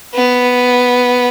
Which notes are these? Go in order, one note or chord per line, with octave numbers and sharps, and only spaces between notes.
B3